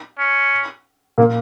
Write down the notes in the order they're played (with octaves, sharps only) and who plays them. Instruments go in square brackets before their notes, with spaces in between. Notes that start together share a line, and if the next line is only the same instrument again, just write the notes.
[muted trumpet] C#4
[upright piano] A#2 A#3